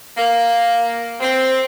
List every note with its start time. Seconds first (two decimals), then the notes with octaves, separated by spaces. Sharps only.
0.18 A#3
1.20 C4